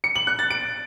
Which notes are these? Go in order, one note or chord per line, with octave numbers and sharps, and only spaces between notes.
C#7
F#7
F#6
A6
D7